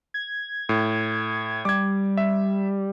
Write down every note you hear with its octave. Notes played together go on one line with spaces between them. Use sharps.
G#6
A2
G3 D6 G#6
E5